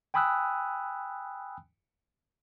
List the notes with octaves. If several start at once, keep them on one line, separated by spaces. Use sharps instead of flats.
G5 G#5 B5 D#6 E6 F#6